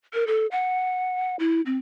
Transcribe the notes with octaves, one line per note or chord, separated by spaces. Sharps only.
A#4
A4
F#5
E4
C4